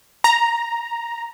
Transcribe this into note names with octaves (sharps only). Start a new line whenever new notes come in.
A#5